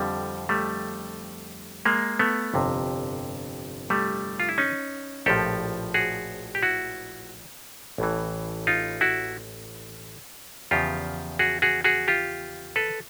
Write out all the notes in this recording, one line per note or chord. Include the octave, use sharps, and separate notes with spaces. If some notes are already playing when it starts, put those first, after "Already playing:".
Already playing: F2 D3 F3 G3
G3 A3
G#3 A#3
A3 B3
G1 F2 C3
G3 A3
F4
E4
C#4 D#4
A#1 A2 F3 G4 A4
F#4 G#4
G4
E4 F#4
A1 A2 E3
D#4 F4
E4 F#4
E2 C#3 F3 F4 G4
F#4 G#4
F#4 G#4
F#4 G#4
F4 G4
A4 B4